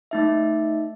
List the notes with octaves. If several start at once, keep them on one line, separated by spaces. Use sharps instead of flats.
A3 D#4 E5